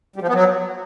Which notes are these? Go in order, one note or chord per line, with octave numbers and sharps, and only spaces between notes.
G3
F3
B3
F#3